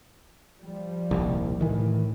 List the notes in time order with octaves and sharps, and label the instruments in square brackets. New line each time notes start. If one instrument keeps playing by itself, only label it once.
[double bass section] F3 G3
[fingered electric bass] D#1 C2
[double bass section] A2 [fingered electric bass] D#3 E3